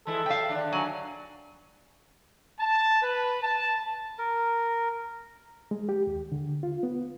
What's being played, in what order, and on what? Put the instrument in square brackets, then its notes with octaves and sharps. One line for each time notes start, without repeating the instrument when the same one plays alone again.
[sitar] E3 G#3 E4 [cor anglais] A4
[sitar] F#3 E5 [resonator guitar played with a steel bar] F5 G5
[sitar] D#2 D3 D4
[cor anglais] F#3 [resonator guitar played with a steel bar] G#5
[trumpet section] A5
B4
A5
[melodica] A#4
[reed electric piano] G#3
G4
D#2
D3
F4
B3